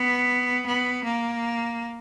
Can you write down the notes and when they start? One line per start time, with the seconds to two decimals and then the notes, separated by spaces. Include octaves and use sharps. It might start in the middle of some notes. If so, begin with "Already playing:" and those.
Already playing: B3
0.66 B3
1.05 A#3